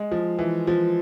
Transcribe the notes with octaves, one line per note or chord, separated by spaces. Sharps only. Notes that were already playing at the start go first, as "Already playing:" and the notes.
Already playing: G#3
F3
E3
F3